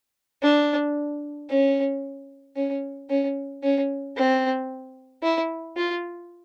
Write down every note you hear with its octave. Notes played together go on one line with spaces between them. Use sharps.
D4
C#4
C#4
C#4
C#4
C4
E4
F4